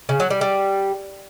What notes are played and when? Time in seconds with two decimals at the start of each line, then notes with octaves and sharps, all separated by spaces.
0.09 C#3
0.20 F#3
0.30 G3
0.41 G3